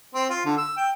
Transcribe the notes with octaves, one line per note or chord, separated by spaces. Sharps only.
C4
F4
D3
E6
G5